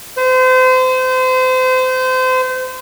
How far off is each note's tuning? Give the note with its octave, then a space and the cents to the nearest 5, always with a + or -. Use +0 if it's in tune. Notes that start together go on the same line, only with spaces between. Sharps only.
C5 -30